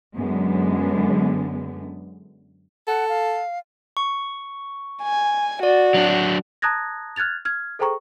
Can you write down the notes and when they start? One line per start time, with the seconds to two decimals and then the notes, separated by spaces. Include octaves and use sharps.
0.15 F#2 D3 G#3 B3
2.87 A4 F#5
3.09 F5
3.97 C#6
5.03 G#5
5.63 F#4 D5
5.94 F#3 D4
6.62 A5 A#5 D#6 F#6 G#6 A#6
7.16 F6 F#6 G#6 A6 F7
7.45 F6 G#6
7.79 G#4 A4 C5 G5 A#5 C#6